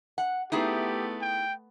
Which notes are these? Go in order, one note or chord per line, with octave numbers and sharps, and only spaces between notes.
F#5
A3 B3 D#4 E4 G4 G#4
G5